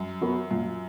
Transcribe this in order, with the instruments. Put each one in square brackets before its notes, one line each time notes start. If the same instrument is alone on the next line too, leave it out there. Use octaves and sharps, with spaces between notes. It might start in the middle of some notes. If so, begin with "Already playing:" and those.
Already playing: [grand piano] F#2
[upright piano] F#3 B3 F#4 A#4
[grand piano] F#2 [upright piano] A#2